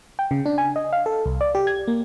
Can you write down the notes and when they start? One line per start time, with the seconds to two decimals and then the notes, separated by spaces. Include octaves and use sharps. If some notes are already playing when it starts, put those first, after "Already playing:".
0.19 G5
0.31 C#3
0.46 D4
0.58 G#5
0.76 D#5
0.93 F5
1.06 A4
1.26 C2
1.41 D5
1.55 G4
1.67 G#6
1.88 A#3